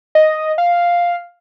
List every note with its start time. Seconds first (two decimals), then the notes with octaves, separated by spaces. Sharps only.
0.15 D#5
0.58 F5